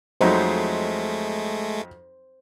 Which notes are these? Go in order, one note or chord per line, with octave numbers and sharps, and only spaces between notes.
F2 F#3 G#3 A3 D#4 C5